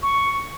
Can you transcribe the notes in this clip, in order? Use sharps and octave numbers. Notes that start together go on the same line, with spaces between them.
C#6